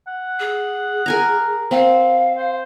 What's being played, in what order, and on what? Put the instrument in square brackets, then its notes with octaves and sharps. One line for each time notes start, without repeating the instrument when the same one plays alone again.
[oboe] F#5
[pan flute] G#4
[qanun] A#4 G#5 A#5
[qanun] C4 [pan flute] F5
[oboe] C5